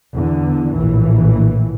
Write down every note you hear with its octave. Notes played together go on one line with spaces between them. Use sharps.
E2 D3
A#1 A2 E3